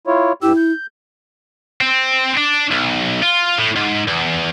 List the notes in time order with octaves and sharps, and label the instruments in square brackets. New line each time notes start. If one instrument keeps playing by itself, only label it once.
[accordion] E4 F4 C#5
[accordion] G2 G4 E6 [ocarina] E4
[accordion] G6
[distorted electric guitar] C4
D4
B1
F4
A2
G#2
E2